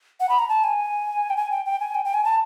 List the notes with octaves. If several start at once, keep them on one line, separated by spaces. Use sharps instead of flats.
F#5
B5
A#5
A5
G#5
G5
G#5
G5
G5
G#5
G5
G5
G#5
A5